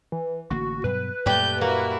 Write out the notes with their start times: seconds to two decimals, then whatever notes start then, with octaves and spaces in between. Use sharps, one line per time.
0.12 E3
0.50 A1 D3 A#3 F#4
0.84 G2 B2 F#3 B4
1.26 F#2 A#2 G3 A3 G4 G6
1.61 A#3 E4 F#4